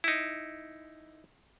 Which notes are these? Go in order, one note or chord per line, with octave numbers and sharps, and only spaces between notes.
D#4 E4